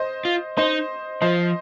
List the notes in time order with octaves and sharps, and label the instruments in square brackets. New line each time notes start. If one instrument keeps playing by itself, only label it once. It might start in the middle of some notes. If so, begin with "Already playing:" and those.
Already playing: [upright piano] C5 D#5
[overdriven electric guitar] F4
[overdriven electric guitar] D#4 [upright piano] C5 D#5
[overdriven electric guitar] F3 [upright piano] C5 D#5